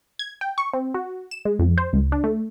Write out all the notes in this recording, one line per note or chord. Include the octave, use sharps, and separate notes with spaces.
G#6
G5
C#6
C4
F#4
E7
G#3
F2
C5
C#2
D4
A3